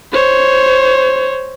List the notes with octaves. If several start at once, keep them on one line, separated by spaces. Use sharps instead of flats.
C5 C#5